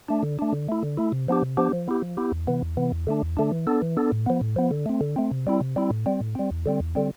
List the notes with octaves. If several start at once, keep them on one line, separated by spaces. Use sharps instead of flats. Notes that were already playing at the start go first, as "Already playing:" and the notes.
A3 D4
D3
A3 D4
D3
A3 E4
D3
A3 E4
C3
F3 B3 D4 G4
C3
F3 B3 D4 G4
F3
B3 E4 G4
F3
B3 E4 G4
E2
C3 E3 B3
E2
C3 E3 B3
E2
D3 A3 D4
E2
D3 A3 D4
E3
B3 D4 A4
E3
B3 D4 A4
A2
F3 B3
A2
F3 B3
D3
A3 C4
D3
A3 C4
C3
G3 C4 E4
C3
G3 C4 E4
A2
G3 C4
A2
G3 C4
E2
D3 G3 C4
E2
D3 G3 C4